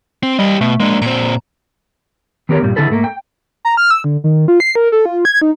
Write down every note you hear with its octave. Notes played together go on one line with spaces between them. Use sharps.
C4
G3 G4 D#5
B2 A3
G#3 A#3 D4
A#2 C4 A#5
D#3 B3 G4 A#4 C#5
G2 A#2 G3
D3 E4 G#4 A4 B4
G#2 A3 A#3
G5
A#5
F6
E6
D3
D#3
F4
C7
A#4
A4
F4
G#6
D#4